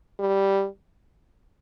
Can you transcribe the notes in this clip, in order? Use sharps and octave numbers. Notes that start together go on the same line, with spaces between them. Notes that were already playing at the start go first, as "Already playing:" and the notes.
G3